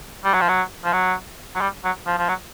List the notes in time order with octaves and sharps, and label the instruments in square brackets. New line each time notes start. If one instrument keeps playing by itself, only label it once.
[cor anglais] G3
F#3
F3
F#3
F3
F#3
F#3
G3
F#3
F3
F3
F#3